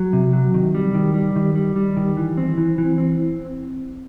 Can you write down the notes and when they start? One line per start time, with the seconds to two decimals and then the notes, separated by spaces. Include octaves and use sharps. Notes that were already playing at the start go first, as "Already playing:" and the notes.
Already playing: F#3
0.13 C3
0.33 F#3
0.54 D#3
0.75 G3
0.94 D#3
1.14 G3
1.36 D#3
1.55 G3
1.76 G3
1.96 D#3
2.17 E3
2.37 C4
2.57 E3
2.78 E3
2.98 C4